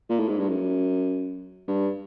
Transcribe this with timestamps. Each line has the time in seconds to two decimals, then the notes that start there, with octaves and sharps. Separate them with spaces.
0.09 A#2
0.19 A2
0.28 G#2
0.39 G2
0.48 F#2
1.68 G2